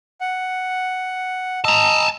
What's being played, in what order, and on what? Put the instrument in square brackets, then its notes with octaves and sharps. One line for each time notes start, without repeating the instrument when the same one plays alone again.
[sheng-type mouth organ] F#5
[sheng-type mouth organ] D#5 E6 [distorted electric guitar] A5 A#5